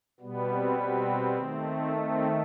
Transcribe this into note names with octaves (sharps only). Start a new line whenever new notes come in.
B2 G3 B3
C4
C4
D#3 A3
C4